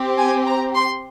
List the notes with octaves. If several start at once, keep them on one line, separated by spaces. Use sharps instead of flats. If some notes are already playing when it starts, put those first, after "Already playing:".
Already playing: C4 G4
G#5
A#5
C6